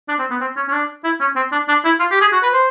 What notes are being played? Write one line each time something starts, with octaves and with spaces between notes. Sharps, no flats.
D4
C4
B3
C4
C#4
C#4
D4
E4
C#4
C4
D4
D4
E4
F4
G4
G#4
F#4
B4
C5